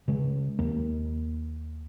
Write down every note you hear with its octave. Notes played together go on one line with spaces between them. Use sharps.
C#3 G#3
D#2 A#3